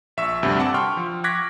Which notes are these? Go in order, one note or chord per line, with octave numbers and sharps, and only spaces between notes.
A#1 E5 C#6 E6
D2 G2 C3
F#5 A5 D6 E6
G5 C6 C#6 F6
F3
C#6 D6 F#6 G#6 A#6 B6